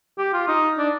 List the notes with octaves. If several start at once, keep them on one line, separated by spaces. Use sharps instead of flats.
G4
F4
D#4
D4